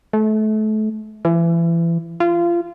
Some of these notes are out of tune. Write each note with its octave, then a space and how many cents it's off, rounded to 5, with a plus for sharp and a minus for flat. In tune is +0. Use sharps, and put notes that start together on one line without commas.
A3 -30
E3 +30
F4 -25